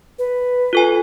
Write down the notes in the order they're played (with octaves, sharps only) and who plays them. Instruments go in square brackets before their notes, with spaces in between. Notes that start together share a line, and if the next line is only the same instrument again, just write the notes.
[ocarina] B4
[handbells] F4 A4 G#5